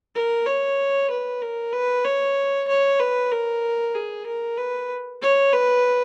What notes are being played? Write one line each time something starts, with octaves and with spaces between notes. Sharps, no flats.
A#4
C#5
B4
A#4
B4
C#5
C#5
B4
A#4
G#4
A#4
B4
C#5
B4